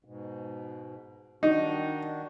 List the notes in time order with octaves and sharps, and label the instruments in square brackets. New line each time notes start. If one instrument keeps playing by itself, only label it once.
[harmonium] G#2 B2
[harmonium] D#3 D4 F#4 [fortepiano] D#4